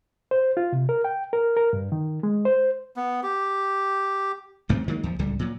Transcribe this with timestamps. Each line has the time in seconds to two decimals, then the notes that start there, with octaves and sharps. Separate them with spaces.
0.31 C5
0.57 F4
0.73 C3
0.89 A#4
1.04 G5
1.33 A#4
1.57 A#4
1.73 G2
1.92 D#3
2.23 G#3
2.45 C5
2.96 B3
3.23 G4
4.69 A1 G2 A3 C4
4.88 D#3 F#3 G#3 A#3
5.03 D#2 F3
5.19 D1 C#2 D3 G3
5.39 A#2 F#3